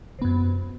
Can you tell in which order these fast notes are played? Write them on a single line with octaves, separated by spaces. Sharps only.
C3 B3 F#2